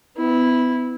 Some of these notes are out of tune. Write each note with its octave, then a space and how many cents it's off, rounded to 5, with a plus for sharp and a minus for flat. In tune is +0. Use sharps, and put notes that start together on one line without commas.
B3 +35 E4 -10